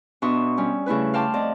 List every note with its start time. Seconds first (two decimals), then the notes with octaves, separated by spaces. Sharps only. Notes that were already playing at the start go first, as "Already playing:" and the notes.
0.22 B2 D4 E5 C6 C#6 D#6
0.57 G3 C#4
0.86 C#3 A3 E4 B4
1.14 F5 G5 A5 C6 D6
1.34 F2 D5 D#5